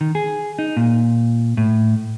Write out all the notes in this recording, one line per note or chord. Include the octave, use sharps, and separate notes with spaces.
D#3
G#4
D#4
A#2
A2